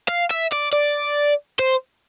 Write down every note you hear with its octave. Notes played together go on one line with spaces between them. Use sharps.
F5
E5
D5
D5
C5